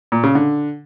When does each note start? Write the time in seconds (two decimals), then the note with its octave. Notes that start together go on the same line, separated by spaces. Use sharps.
0.12 A#2
0.24 C#3
0.35 D3